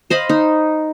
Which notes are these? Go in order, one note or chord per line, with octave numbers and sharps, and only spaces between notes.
C5 D#5 F5 B5
D#4